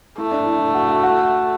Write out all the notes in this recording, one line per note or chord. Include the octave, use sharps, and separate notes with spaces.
A3 E4
D4
E4
E4
F#4
F#4
F#4